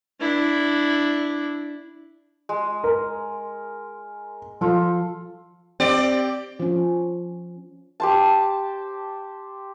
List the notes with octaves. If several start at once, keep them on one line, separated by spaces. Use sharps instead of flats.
D4 E4
G#3
A#4
F3 F4 A4
C4 G4 D5
F3 C#4
G4 C5 A5